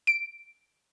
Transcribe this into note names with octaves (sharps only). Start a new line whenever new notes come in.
D7